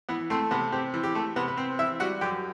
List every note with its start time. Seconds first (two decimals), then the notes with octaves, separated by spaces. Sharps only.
0.09 E3 B3 B4
0.30 A3 C4 C5
0.51 C3 B3 B4
0.72 C4 G4
0.94 E3
1.03 G4
1.15 A3 A4
1.36 C3 B3 B4
1.48 B4
1.57 C4 C5
1.79 E3 E4 E5
2.00 G3 F#4 F#5
2.21 F#2 G4 G5